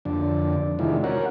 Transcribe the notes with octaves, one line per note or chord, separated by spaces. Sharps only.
F2 D3 D4
C3 D#3 G#3 D4 E4 F4
C#4 F#4 A#4 F#5